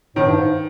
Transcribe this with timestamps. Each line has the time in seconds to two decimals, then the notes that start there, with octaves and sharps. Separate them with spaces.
0.16 A2 D#3
0.26 G2
0.37 G#2